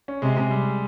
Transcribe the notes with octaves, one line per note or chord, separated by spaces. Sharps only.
C#4
C3 G#3
G#3
G3